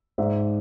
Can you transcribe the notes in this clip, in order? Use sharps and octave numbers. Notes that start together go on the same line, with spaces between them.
G#2 D5 E5